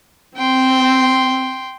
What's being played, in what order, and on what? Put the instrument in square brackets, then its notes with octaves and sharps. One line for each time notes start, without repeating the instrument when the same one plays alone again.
[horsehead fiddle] C4 [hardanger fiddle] G5 C6